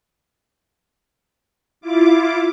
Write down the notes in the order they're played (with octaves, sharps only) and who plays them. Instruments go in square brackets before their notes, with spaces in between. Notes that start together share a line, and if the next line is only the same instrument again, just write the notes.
[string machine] E4 F4 D6